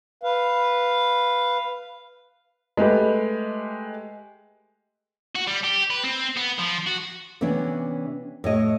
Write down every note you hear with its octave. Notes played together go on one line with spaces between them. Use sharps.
B4 F5
G#3 A3 G4 B4
F#4
G3
G4
B4
C4
B3
F3
F#4
C3 E3 B3 C#4 D4
A2 C#5 D#5